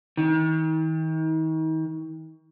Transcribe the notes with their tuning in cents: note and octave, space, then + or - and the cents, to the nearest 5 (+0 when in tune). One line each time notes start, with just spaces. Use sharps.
D#3 +40